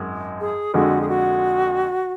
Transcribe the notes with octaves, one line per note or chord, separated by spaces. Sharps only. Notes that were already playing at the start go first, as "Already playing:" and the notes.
Already playing: G#1 F#2 G#3
G#4
F2 D3 G#3 F#4
G#4
F#4